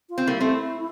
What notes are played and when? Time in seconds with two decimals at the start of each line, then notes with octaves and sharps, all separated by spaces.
0.10 F4
0.18 C4
0.27 G3 A#3 E4
0.40 A3 C4